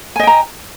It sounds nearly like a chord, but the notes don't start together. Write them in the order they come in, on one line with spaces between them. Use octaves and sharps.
G#5 D#5 G5 A#5